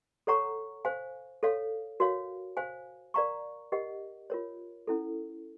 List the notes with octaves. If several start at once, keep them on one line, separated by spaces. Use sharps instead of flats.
A4 C#5 F#5 A#5 C#6
C5 F5 G#5
A4 C#5 F5
F#4 A#4 C#5 F5
C5 F5 G#5
A#4 D5 F5 A#5 C#6
G4 A#4 D#5 F#5
F4 A#4 C#5
C#4 E4 A4